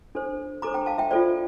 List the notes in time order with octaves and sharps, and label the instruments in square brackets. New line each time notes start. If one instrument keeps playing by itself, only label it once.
[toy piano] D4 A4 C5
D4 A4 C5 A#5 D6
G5 A#5
F5 A5
E5 G5
F4 A4 C5 D5